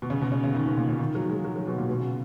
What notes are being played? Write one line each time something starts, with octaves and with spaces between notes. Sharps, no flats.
B2
C#3
B2
C#3
C#3
D#3
B2
A#2
C#3
D#3
F#3
G#3
F#3
F#3
B2
A#2
B2
C#3